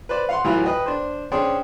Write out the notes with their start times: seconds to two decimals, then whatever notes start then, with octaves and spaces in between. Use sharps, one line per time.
0.09 B4 C5 D5
0.29 F5 F#5 C6
0.44 A2 E3 F#3 E4 F4
0.64 B4 D#5 G5
0.86 D4 C5
1.32 C#4 D4 G#4 C5 G5